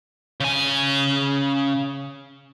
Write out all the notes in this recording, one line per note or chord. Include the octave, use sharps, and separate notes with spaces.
C#3 G#5